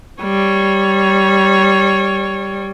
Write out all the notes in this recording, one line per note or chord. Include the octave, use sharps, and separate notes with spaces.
G3 C#5